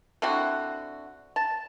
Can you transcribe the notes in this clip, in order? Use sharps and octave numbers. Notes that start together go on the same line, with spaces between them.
D3 C4 E4 F#4
A5